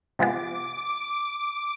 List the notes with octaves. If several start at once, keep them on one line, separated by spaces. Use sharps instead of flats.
C3 F3 G#3 B3 D6